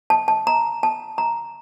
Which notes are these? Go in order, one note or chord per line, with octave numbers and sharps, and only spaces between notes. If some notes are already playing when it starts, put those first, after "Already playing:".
A5
A5
A#5
A5
A#5